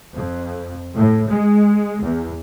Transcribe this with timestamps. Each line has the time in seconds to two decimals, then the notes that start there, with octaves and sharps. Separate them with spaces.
0.14 F2
0.94 A2
1.29 G#3
2.01 E2